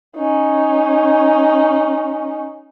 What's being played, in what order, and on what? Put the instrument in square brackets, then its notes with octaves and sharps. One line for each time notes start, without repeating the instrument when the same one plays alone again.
[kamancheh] C#4 D#4